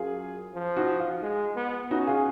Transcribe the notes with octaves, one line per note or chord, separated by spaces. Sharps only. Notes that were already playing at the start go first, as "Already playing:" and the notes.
Already playing: F#2 F4 G#4
F3
D#4 F#4
F4
G#3
B3
C#4 D#4 F#4
F4 G#4